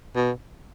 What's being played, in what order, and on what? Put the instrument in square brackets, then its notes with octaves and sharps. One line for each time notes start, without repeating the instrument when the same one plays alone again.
[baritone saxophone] B2